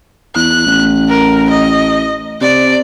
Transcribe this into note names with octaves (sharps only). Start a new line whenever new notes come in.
E2 F#6
A1
A#4
D#5
C3 D5